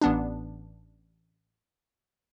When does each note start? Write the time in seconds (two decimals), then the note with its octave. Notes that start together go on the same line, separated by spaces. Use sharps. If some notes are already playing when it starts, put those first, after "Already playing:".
0.02 A1 B3 D4